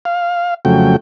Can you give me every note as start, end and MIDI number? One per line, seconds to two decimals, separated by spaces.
0.05 0.54 77
0.65 0.96 41
0.65 0.96 49
0.65 0.96 54
0.65 0.96 57
0.65 0.96 79